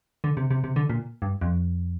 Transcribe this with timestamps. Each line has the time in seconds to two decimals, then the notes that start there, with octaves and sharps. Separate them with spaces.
0.24 D3
0.37 C3
0.51 C3
0.64 C3
0.76 D3
0.90 A#2
1.22 G2
1.41 F2